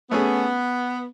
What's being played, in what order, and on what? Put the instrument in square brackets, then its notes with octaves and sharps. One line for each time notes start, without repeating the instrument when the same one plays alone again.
[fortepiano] A3 C#4 G#4 [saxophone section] B3